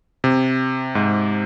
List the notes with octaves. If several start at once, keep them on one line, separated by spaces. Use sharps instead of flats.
C3
G#2